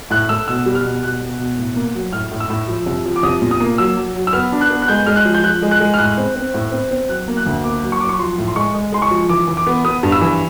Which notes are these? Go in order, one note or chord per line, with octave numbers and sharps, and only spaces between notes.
A2 F#6
A3 E6
B2 E6
G3
F6
B2
B2 F#6
B2
B2
A2
A#3
F#3
A2 F6
A2
E6
A2
F3
C2
F3
D6
C2 D#6
A#2
D#6
A#3
F#3 E6
F#3
F#3
E6
B3 F6
D4
F#6
B3
F#6
G#3 G6
G#3 F6
F#6
F3
G6
F3 F#6
G#3
F#6
G#3
F6
A2 F#6
C4
C4
A2
C4
C4
F#3 F#6
A#3
F#6
D2
A#3 D6
F#3
C#6
F#3 D6
C#6
F3 C6
A2
C6
G#3 C#6
G#3
G#3 C6
C#6
F3
E3 D6
E3
D6
B3
B3 D#6
G2
E6
E3